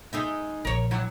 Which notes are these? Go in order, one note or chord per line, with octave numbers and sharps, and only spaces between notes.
G#3 D#4 E5
A#1 A#4 C#5
G2 F#3 E4